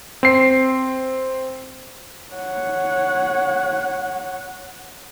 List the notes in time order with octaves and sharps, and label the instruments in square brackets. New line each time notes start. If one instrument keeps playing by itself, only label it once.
[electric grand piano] C4 C7
[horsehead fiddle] C#5 F#5